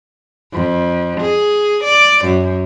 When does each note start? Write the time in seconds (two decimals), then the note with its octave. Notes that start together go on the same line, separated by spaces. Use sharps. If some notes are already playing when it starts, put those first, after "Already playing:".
0.53 F2
1.21 G#4
1.84 D5
2.26 F#2